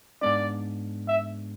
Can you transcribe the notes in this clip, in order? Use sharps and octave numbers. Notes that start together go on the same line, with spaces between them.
G#2 G#3 B3 D4 D5
E5